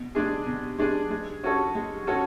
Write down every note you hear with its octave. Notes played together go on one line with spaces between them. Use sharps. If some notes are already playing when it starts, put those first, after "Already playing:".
Already playing: B2
G#3 D4 G#4
B2
G#3 D4 G#4
G#3
C#4 F#4 A4 C#5
G#3
C#4 F#4 A4 C#5